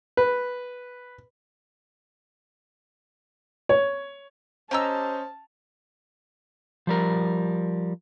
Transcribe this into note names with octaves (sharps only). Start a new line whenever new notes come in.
B4
C#5
C#4 G4 C5 D#5 A5 A#5 E6
F3 G3 A#4